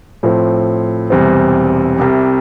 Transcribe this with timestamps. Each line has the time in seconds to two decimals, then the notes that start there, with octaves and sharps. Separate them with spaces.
0.23 A2 F3 C4
1.10 E1 E2 C3 G3 C4
1.98 C2 C3 G3